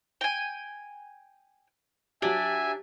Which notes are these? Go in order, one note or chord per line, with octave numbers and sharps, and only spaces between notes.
G5 G#5
F#3 D4 G4 E5 G#5